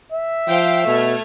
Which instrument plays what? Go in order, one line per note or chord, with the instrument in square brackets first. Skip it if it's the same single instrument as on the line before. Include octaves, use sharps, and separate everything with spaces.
[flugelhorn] E5
[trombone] F3 [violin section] C5 F5 G5
[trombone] B2 [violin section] A3 F6 G#6